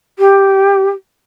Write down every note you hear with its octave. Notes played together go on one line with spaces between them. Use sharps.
G4